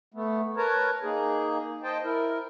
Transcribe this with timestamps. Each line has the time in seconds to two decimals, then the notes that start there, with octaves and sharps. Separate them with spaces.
0.14 A3 B3
0.57 A#4 B4 C#5 A5 A#5
1.03 A#3 D#4 G#4
1.83 C5 D#5 G5 A5
2.04 E4 A#4